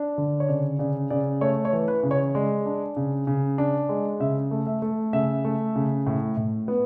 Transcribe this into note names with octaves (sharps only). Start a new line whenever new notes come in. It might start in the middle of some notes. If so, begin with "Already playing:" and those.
Already playing: D4
D3
C#5
C#3 D5
C#3 D5
C#3 D5
A3 C#5
C#5
E3
B4
C#3
C#5
G#3 D5
D4
C#3
C#3
D4
G#3
C#3 E5
A3
E5
A3
C#3 E5
A3
C#3
A2
A2
B3